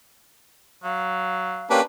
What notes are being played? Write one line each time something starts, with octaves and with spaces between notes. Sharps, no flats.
F#3 F5
A#3 C#4 D4 G4 B4